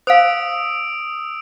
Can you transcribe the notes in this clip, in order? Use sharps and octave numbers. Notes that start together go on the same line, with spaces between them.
C5 F5 D#6 E6 D7